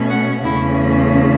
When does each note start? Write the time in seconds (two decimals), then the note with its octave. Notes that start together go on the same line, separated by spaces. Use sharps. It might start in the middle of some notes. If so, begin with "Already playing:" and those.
Already playing: B2 A3 C#4
0.09 F#5
0.44 E2 C#3 A3 C#4 E4